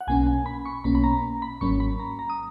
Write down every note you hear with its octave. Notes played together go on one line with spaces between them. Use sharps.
F#5
B1 B2 A#3 C#4 G#5
G#5
B5
C#6
B1 B2 A#3 C#4 B5
B5
A#5
B5
G#1 G#2 F#3 A#3 C#4 C#6
B5
A#5
A#5
D#6